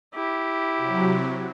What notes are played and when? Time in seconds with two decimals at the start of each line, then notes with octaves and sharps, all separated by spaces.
0.14 E4 G4
0.75 C3 F#3